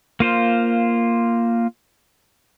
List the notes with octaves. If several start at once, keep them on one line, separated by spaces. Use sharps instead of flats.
A#3 F4 C5